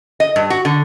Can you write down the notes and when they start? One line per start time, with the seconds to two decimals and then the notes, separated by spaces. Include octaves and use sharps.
0.20 D#5
0.36 G2
0.50 F#4
0.65 D3